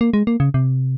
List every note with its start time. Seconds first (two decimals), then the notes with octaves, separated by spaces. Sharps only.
0.01 A#3
0.13 G#3
0.27 A#3
0.40 C#3
0.54 C3